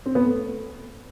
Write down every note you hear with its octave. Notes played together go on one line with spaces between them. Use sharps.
C4
B3
A3